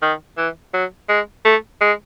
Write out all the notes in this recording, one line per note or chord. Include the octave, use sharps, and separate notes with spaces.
D#3
E3
F#3
G#3
A3
G#3